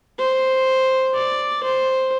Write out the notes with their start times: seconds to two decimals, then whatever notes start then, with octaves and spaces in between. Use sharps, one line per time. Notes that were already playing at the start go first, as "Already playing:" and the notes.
0.20 C5
1.15 D5
1.63 C5